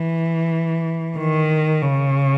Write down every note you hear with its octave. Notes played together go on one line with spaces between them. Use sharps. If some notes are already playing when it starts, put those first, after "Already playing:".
Already playing: E3
D#3
C#3